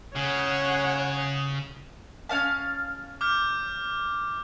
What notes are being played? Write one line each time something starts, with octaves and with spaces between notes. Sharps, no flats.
C#3 C#5 F#5
C#4 F5 A5
D6 F6 G6